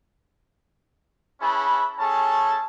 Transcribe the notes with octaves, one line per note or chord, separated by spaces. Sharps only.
C#4 E4 G#4 B4 A5 B5
A3 C#4 G#4 A4 A5